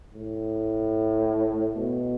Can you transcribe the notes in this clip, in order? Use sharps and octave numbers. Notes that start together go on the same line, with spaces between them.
A2
B2